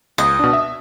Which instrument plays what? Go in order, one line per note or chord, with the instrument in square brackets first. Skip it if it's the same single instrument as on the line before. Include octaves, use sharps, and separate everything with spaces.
[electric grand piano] C#2 [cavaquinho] D#5
[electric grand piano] B2 D4
E5